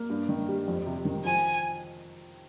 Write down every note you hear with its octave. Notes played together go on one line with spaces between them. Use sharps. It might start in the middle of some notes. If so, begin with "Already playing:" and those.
Already playing: A#3
G2
D#3
G3
F2
C3
D#3
F3 G#5